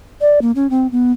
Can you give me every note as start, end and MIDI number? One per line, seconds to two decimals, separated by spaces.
0.21 0.39 74
0.41 0.51 58
0.55 0.69 61
0.70 0.87 60
0.92 1.12 59